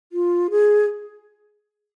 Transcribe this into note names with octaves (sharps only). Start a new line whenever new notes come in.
F4
G#4